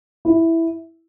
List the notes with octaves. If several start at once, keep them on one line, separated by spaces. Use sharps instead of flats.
E4